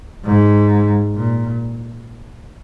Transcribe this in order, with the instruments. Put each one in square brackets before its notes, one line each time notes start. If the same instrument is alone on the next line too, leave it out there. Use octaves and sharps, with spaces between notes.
[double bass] G#2
A#2